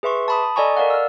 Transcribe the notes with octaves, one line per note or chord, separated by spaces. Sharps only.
G#4 B4 E5 C6 C#6
A5 B5 D#6
D#6
A4 D5 D#5 G#5 A#5 C#6
A#4 D5 F5 F#5
E6 F6